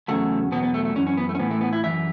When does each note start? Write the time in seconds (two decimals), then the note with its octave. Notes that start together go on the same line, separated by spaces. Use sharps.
0.08 E2 C#3 F#3 A3
0.52 E2 B2 F#3 B3
0.63 B3
0.74 A3
0.85 A3
0.96 E3 C#4
0.99 F#2
1.07 C#4
1.17 B3
1.29 A3
1.35 C#4
1.39 A2 E3 B3
1.51 A3
1.61 B3
1.73 E4
1.83 F#2 E3 E5